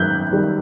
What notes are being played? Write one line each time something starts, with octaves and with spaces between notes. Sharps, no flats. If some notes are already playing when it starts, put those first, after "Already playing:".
Already playing: F#2 D#3 F#6 G6
D#3 G3